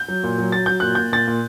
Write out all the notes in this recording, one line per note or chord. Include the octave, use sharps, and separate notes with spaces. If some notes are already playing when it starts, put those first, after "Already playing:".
Already playing: G6
F#3
A#2
F#3
F#3 A6
F#3 G6
A#2 F#6
A#2 G6
A#2 A6
A#2